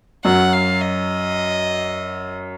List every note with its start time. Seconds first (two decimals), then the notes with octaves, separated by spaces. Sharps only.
0.25 F#2 F#3 F#5
0.53 F5
0.81 D#5